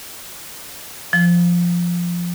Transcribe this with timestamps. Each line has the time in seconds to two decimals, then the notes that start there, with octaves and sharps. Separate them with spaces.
1.13 F3